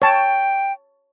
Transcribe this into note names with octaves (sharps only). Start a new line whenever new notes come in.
C#5 G5 A5